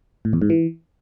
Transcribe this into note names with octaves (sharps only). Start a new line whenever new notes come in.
A2
E2
G#2
E3